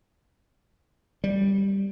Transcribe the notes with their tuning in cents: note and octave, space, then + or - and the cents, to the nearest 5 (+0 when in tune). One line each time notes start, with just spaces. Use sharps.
G3 +5